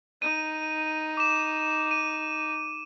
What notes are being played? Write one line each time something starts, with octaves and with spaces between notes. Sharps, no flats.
D#4 D#7
D6 E7
D#7